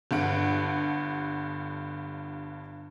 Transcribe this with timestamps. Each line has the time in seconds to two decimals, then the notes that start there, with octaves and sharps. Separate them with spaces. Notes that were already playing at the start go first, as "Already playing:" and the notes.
0.11 G1 G2 D3 F#5 D7